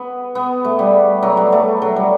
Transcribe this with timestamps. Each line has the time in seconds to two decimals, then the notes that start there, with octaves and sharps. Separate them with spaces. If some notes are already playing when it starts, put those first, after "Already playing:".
Already playing: B3
0.35 B3
0.65 A3
0.79 G3
1.23 F#3
1.37 G3
1.52 A3
1.82 F#3
1.96 G3